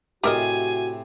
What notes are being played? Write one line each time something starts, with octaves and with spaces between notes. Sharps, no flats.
A2 C3 F#4 G4 A#4 D#5 G#5 A5